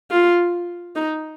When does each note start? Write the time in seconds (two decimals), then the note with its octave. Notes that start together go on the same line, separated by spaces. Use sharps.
0.11 F4
0.96 D#4